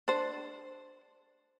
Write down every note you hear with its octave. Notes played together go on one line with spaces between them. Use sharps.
D4 C5